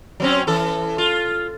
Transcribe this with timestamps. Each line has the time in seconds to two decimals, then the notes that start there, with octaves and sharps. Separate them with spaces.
0.20 F#3 C4 C#4
0.47 E3 A4
0.98 F4